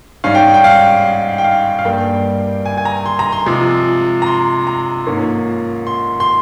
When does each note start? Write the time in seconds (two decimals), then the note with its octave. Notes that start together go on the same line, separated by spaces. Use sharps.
0.24 G#2 G3 C#4 F5
0.35 G5
0.54 G5
0.64 F5
1.38 G5
1.44 F5
1.79 F5
1.85 G2 G3 A#3 G5
2.66 G#5
2.78 G#5
2.85 A#5
3.06 C6
3.19 A#5
3.32 C6
3.46 C3 F3 G#3
4.22 A#5
4.26 C6
4.67 A#5
5.07 G#2 F3 A#3 C#4
5.87 C6
6.20 C6